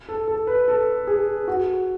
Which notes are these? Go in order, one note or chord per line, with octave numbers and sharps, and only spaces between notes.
A4
A4
B4
A4
G#4
F#4